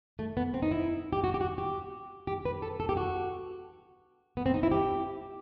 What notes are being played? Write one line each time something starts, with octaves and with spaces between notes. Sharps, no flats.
A3
B3
C4
D#4
E4
G4
F#4
G4
F#4
G4
G4
B4
A4
A4
G4
F#4
B3
C4
D#4
E4
G4